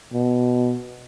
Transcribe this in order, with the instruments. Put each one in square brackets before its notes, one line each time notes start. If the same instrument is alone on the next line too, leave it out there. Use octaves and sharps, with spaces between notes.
[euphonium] B2